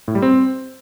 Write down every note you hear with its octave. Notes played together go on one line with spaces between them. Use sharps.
A2
G3
C4